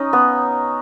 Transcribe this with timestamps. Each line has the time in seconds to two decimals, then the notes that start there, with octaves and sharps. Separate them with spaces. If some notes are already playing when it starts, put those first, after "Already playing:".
Already playing: C#4 D#4
0.13 B3